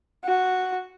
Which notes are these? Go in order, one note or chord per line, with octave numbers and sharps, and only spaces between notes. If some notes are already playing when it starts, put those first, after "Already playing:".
F#4